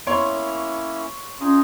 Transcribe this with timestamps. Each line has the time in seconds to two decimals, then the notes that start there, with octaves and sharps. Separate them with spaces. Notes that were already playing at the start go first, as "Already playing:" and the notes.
0.07 A#3 B3 C#4 E4 C#5 C6
1.40 C#4 D#4 F4 G#4